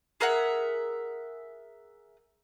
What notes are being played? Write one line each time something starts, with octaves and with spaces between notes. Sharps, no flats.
G#4 A#4 E5 F#5